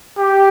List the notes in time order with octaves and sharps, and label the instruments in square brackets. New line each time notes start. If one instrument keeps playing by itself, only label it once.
[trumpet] G4